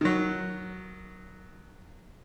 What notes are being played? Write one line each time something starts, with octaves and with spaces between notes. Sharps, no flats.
D#3 F#3